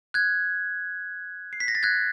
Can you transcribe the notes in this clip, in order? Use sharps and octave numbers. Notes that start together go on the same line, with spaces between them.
F#6 G#6
C7
B6
A#6
A6
F#6 G#6